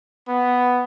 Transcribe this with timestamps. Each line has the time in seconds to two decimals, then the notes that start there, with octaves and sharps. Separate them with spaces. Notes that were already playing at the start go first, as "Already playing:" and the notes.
0.28 B3